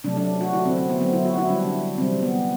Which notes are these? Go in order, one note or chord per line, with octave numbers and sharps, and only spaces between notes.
C3 F#3 A3 D4
D4
F#4
D3 A3 E4
C4
C4
B3
D3 F#3 A3 C4
E4
F#4
E4
D3 G3 D4
C3 E3 G3 C4
B3